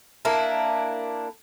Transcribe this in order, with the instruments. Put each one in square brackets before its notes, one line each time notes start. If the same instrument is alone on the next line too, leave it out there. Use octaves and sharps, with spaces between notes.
[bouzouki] A#3 D4 E4